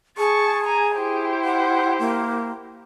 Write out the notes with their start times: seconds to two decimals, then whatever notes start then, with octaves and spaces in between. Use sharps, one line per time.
0.18 G#4 A5 C#6
0.66 G#5 A#5
0.95 E4 G4 C5
1.44 F#5
1.99 A#3